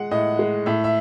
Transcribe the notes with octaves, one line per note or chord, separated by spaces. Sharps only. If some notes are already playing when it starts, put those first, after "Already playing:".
Already playing: G#3 F#5
A2 D#5
G#3
A2 E5
E5